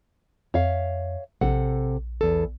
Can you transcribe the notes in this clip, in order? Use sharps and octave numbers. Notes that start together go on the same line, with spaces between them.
F2 C#5 E5 F5
A#1 C3 A4 F#5
E2 A4